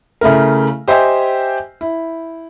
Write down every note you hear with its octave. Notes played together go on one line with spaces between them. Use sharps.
C#3 A3 E4 A#4
G4 C5 D#5 E5 G5 G#5
E4